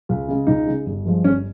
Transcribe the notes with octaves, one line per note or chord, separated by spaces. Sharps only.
C#2
C#3 G#3
C#2 D#4
C#3 G#3
G1
G2 F3 G#3
G1 C#4